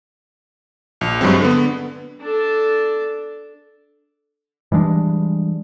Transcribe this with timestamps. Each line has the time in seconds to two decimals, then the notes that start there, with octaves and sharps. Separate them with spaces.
1.01 A#1
1.21 G2 F#3 G#3 C4
1.40 D3 B3
2.22 D4 A4
4.72 E3 G3 G#3 D4